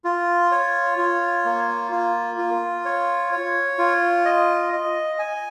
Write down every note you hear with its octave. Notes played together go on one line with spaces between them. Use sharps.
F4
C#5
F4
A#3
F4
F4
C#5
C#5
F4
D#5
D#5
G#5